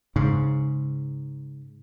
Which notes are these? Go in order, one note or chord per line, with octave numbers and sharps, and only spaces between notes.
G#2 C#3